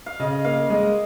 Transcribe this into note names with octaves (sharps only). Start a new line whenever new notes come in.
F5
C#3 D#5
A#3 F5
G#3 D#5